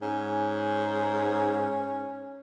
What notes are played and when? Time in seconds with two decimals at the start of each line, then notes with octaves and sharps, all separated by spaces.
0.02 G#2 C#4